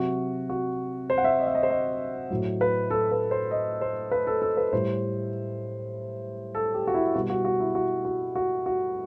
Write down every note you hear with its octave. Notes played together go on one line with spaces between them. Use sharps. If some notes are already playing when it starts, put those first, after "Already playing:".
Already playing: C3 F#3 F#4
F#4
C5
F#5
E5
D#5
E5
D#5
C5
D#5
A2 F#3
B4
A4
B4
C5
D#5
C5
B4
A4
A4
B4
A2 G3 C5
A4
G4
F#4
E4
B2 G3 F#4
F#4
F#4
E4
F#4
F#4
F#4
F#4